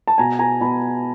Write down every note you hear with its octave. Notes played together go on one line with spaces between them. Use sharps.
A5
B2 G#5 A#5
G#5 A#5
B2 A5 B5